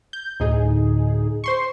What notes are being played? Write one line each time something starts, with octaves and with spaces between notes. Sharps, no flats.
G6
D2 A2 D#4 G#4
C5 C6 C#6